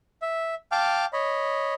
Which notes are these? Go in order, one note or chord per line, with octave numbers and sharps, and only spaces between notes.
E5
F5 G5 A5 D6 F6
C#5 D#5 B5